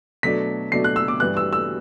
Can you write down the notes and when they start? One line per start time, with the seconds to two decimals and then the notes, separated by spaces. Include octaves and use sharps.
0.23 B2 F#3 A3 D4 B6
0.72 B2 F#3 A3 D4 C7
0.84 F#6
0.96 E6
1.08 D6
1.20 G2 E3 G3 B3 F#6
1.37 E6
1.53 E6